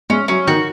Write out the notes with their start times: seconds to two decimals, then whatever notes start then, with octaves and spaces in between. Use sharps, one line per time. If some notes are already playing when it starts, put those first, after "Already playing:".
0.10 G#3 C#4
0.28 F#3 C#4
0.47 D#3 F#4